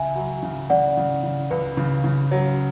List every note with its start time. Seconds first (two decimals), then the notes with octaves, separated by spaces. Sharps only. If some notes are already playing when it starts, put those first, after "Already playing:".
Already playing: C#2 E5 G#5
0.16 F#3
0.43 C#3
0.70 C#3 D5 F#5
0.97 C#3
1.23 C#3
1.51 C#2 B4
1.77 C#3
2.04 C#3
2.31 F#3 C#5